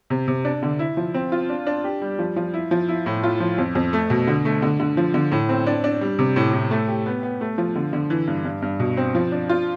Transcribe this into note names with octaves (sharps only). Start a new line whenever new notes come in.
C3
C3
D4
D3
E4
F3
C4
F4
D4
D4
G4
G3
F3
F3
E4
F3
E4
A2
F4
F3
F2
F2
A3
B2
D3
A3
D3
D3
F3
D3
A2
C4
D4
D4
G3
C3
A2
A2
A3
G4
B3
B3
A3
F3
D3
D3
E3
G2
G2
G2
B2
C4
F3
D4
F4